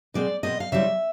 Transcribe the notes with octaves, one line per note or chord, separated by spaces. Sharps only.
B2 G#3 C4 D5
B2 G#3 C4 D#5
F5
C#3 E3 G3 C4 E5